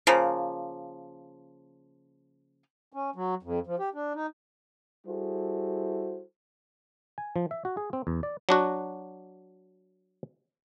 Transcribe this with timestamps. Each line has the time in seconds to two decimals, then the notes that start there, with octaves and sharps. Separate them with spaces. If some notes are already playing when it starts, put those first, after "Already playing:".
0.07 C#3 F3 A#3
2.93 C#4
3.16 F#3
3.43 F2
3.67 F3
3.79 G4
3.94 D4
4.15 D#4
5.07 G3 E4 F#4 G#4 A4 C5
7.18 G#5
7.36 F3
7.51 E5
7.65 F#4
7.77 G#4
7.93 C4
8.07 E2
8.23 D5
8.49 F#3 D4 F#4